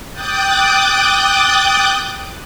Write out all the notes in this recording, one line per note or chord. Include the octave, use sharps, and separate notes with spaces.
G5 D6 D#6 F#6 G6 A6